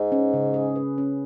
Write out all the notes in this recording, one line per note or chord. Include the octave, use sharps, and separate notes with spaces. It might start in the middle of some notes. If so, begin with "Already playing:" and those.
Already playing: G#2
C#4
C#3
G#4
B4
C#4